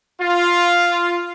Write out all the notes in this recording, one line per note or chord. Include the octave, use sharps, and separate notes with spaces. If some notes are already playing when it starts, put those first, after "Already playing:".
F4